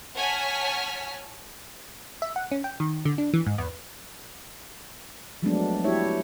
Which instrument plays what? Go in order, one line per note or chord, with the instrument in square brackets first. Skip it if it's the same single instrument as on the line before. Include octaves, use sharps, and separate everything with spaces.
[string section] C#5 F#5 G#5 A5 F6 B6
[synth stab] E5
F#5
C#4
G5
D#3
D3
D4
E3
G#2
E2
[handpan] F3 F#3 G#3 A3 B3 D4
E4 F#4 G4 C#5 E5